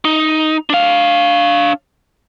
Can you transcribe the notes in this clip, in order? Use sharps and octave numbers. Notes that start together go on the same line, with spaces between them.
D#4
D4 F5